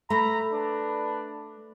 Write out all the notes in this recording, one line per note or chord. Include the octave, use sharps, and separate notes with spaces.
A3 A#5 B5
D4 B4